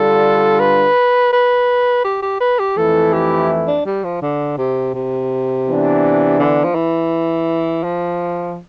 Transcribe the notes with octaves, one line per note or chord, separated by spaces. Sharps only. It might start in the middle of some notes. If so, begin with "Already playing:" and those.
Already playing: D3 G3 D4 F4 A4
B4
B4
G4
G4
B4
G4
F2 E3 A3 E4 A4
G4
D4
G3
F3
D3
C3
C3
E3 B3 D4
D3
F3
E3
F3